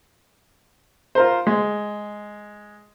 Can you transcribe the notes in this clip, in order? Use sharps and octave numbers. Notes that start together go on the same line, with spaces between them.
F4 A#4 C5
G#3